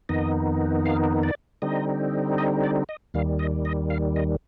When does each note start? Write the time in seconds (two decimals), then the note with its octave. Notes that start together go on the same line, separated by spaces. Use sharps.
0.09 F2 D#3 B3 D#4 D#5
0.86 F5
1.23 D5
1.62 D3 G3 C4 D#4 D#5
2.38 D#5
2.63 D5
2.89 D#5
3.14 D#2 D#3 G3 F5
3.39 D#5
3.65 D#5
3.90 F5
4.16 D#5